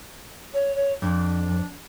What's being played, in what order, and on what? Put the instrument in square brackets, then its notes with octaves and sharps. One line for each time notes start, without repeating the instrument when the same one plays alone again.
[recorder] C#5
C#5
[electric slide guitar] F2 [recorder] D4